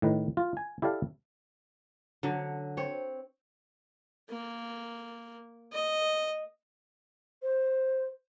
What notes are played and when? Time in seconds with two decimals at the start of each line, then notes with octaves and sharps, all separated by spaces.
0.02 A2 D#3 B4
0.37 F4
0.57 G#5
0.82 E4 G4 A4 D5 F5
2.23 D3 F#3
2.77 C4 C#5
4.30 A#3
5.72 D#5
7.42 C5